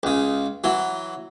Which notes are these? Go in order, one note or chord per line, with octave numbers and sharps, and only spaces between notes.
C#2 C#3
E3 F#3